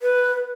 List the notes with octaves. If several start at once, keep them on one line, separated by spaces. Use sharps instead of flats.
B4